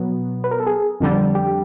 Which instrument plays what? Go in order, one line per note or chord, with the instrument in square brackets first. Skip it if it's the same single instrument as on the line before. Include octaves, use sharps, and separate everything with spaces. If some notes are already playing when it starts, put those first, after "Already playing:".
Already playing: [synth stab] B2 F#3 B3
[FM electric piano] B4
A#4
A4
G#4
[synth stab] F2 D3 G3
[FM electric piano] G4